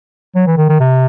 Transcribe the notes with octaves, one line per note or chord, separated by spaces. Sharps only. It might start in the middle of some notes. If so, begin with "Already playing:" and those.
F#3
E3
D#3
D#3
C3